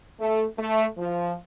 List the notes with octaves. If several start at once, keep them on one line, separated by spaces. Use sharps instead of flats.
A3
A3
F3